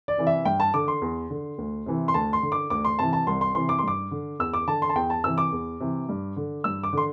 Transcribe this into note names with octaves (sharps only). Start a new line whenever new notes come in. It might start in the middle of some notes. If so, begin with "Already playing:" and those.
D5
C3 E3
E5
G2 G5
A5
D3 D6
C6
E2
D3
D2
C3 E3
C6
D2 A5
C6
D3
D6
D2 D6
C6
C3 E3 A5
A5
C2 C6
C6
C3 E3 C6
D6
C6
G2 D6
D3
E2 E6
D6
D3 A5
C6
A5
E2 G5
A5
C3 E3 E6
D6
E2
C3 E3
G2
D3
G2 E6
D6
D3 C6